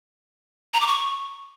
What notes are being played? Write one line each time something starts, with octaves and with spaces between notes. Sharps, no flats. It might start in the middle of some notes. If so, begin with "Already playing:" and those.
A#5
D6
C#6